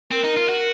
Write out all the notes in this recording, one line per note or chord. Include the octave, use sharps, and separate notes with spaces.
C4 A#4
D#4
F4
F#4